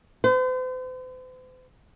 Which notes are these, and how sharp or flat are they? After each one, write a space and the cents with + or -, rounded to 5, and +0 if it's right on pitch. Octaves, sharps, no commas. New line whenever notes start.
C5 -45